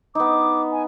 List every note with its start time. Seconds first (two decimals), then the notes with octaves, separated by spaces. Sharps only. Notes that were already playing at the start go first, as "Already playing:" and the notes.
0.15 B3 D#4 D6
0.72 G#5